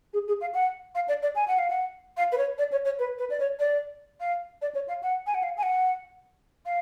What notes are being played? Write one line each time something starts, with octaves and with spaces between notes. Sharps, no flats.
G#4
G#4
F5
F#5
F5
D5
D5
G#5
F#5
F5
F#5
F5
B4
C#5
D5
C#5
C#5
B4
B4
D5
C#5
D5
F5
D5
C#5
F5
F#5
G#5
F#5
F5
G#5
F#5
F5